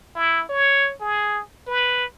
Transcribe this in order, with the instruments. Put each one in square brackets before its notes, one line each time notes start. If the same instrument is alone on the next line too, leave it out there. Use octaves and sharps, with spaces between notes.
[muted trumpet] E4
C#5
G#4
B4